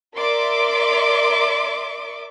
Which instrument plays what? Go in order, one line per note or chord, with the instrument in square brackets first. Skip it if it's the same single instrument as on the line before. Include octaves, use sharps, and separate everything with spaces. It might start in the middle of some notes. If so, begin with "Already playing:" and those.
[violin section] A#4 D5 E5 C6 D6